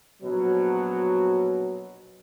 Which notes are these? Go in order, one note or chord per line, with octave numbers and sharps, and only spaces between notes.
A#1 B2 F#3